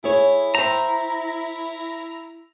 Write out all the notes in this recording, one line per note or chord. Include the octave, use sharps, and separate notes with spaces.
E4 G#4 C#5
C5 E5 G5 A#5